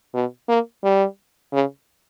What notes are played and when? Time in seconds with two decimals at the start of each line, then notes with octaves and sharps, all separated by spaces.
0.14 B2
0.49 A#3
0.84 G3
1.53 C#3